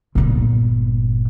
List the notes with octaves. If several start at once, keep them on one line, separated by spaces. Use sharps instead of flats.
G1 A#2